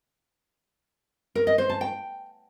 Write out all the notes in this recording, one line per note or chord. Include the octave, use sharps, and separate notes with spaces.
A#4
D#5
C5
A5
G5